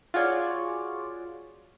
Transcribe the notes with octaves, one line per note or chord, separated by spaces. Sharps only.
F4 F#4 G#4 C#5 D5